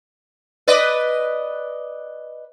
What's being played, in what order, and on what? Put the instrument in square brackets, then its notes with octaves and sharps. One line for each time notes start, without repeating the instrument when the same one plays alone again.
[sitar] B4 D5 D#5